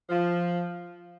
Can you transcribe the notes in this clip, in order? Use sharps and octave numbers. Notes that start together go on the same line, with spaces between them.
F3